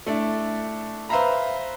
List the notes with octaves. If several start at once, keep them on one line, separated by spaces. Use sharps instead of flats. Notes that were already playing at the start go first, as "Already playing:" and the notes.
A3 D4 E4
B4 C5 E5 F5 A#5 B5